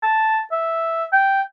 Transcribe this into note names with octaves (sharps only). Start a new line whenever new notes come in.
A5
E5
G5